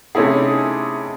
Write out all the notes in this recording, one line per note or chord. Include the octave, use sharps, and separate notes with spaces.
C3 A3 C#4 D#4 E4 G#4